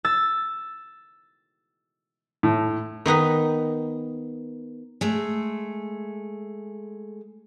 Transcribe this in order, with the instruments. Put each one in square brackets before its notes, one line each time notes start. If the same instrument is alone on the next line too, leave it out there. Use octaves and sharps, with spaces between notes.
[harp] E6 A6
[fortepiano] A2
[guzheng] D#3 B3 D#4 B4
[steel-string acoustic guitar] G#3 A3